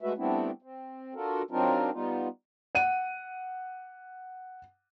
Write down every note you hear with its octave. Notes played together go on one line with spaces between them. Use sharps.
G#3 A3 F#4 B4 E5
G3 A3 B3 C4 D4 E4
C4
D4 F4 F#4 A4 A#4
F#3 C4 D4 D#4 F4 A#4
G3 B3 D#4 F4
F#5 D#7